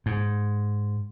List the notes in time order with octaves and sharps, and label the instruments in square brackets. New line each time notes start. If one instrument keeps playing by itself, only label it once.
[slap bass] G#2